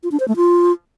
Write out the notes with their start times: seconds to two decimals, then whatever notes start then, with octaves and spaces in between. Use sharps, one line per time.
0.03 F4
0.12 D4
0.20 C5
0.28 A3
0.36 F4